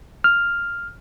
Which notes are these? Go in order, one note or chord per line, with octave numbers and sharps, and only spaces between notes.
F6